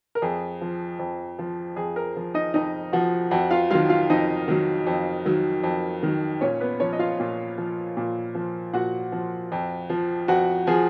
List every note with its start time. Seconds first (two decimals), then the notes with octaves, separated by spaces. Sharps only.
0.15 A#4
0.22 F2 G#4
0.61 F3
0.99 F2
1.39 F3
1.76 F2 G#4
1.96 A#4
2.16 F3
2.34 D#4 D#5
2.54 F2 D#4 D#5
2.93 F3 F#4 F#5
3.31 F2 F#4 F#5
3.51 F4 F5
3.71 D#3 F#3 F4 F5
3.89 F4 F5
4.10 F2 D#4 D#5
4.48 D#3 F#3
4.87 F2
5.25 D#3 F#3
5.64 F2
6.03 D#3 F#3
6.41 A#2 C#4 C#5
6.60 B3 B4
6.80 F3 C#4 C#5
6.93 D#5
6.99 F4 F5
7.20 A#2
7.58 F3
7.97 A#2
8.35 F3
8.73 A#2 F#4 F#5
9.12 F3
9.52 F2
9.90 F3
10.28 F2 F#4 F#5
10.67 F3 G#4 G#5